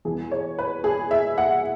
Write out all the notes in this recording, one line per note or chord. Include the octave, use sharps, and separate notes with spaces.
E2 E3 B3 G#4
C#5
B4
G#4
E5
F#5